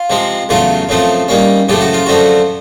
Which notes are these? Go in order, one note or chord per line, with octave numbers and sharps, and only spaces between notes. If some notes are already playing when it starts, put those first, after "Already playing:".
Already playing: F4
C3 F3 G#3 C4
E2 C#3 F#3 A3 F4
F#2 C#3 F3 A3 C4
D#3 G3 A#3 C#4
F#2 C#3 F3 A3 G4
F#4
F4
F#2 D3 F3 A3 C4 F#4